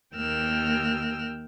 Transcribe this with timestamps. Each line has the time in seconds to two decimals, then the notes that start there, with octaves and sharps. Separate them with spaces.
0.15 D#2 A#3 G5 E6 F6